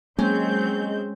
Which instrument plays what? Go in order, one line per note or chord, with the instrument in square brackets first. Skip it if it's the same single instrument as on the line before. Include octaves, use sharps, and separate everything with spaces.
[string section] F#3 C4 G6 [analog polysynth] G#3 [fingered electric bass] A#3 [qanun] C#4